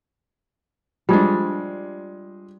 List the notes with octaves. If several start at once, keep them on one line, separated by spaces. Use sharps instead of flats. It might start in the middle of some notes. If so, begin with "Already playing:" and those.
F3 G3 G#3 D4